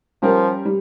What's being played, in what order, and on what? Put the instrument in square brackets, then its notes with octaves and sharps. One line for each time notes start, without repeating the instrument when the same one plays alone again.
[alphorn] F3 [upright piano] G3 C#4 G4 A#4
[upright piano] G3